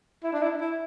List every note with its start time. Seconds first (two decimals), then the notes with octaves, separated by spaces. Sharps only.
0.24 E4
0.33 D4
0.42 E4
0.60 E4